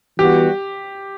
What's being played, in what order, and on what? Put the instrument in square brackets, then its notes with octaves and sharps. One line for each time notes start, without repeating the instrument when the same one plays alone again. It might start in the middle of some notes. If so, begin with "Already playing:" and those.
[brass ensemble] E3 G3 B3 F#4 [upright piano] G4